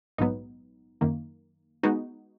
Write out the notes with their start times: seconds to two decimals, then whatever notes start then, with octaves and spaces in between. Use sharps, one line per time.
0.18 A#1 G#2 F#3 B3 D#4
1.01 F#2 D#3 A#3
1.83 G#3 B3 D#4 F#4